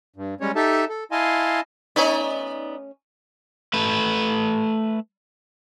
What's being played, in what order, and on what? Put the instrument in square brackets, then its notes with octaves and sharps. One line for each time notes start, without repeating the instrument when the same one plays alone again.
[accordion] G2
G3 G#3 C#4 C#5
D#4 G4 A4 E5 A5
A4
E4 D#5 F5 G#5 A5 C6
[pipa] A3 C#4 [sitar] B3 D#4 D5
[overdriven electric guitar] A3 B4